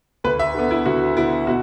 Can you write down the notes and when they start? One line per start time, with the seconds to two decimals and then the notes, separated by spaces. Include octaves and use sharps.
0.24 D2 B4
0.39 E5
0.55 D3 B3
0.71 E4
0.86 D2 F#4
1.17 D3 B3 E4
1.47 B2 F#4